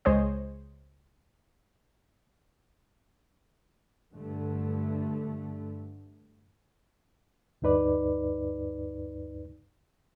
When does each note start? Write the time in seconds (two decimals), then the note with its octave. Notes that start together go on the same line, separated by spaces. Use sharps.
0.05 C#2 G#3 G#4 C5 C#5 D#5
4.12 G2 D3 A3
7.62 D2 G2 D#4 B4 D5